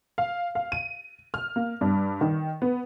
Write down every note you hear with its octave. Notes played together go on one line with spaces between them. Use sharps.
F5
F5
D#7
F6
A#3
G2
D#3
B3